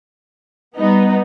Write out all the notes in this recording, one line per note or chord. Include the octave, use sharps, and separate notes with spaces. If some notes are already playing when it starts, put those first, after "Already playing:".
G3 B3 D#4